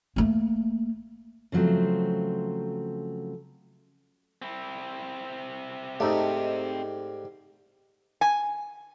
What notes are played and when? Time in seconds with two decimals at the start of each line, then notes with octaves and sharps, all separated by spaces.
0.16 A3 A#3
1.52 C#3 F3 F#3 A3 C4
4.42 C4 E4
6.00 G#2 G3 A3 D#4
8.21 G#5